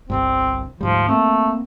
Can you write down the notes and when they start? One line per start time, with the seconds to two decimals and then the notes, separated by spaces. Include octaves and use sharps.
0.10 G1 C2 G2 C4
0.81 D2 G#2 F3 G3
1.09 A3 A#3 C4